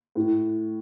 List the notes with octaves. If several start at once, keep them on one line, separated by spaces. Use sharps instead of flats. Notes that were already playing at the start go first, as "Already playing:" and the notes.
A2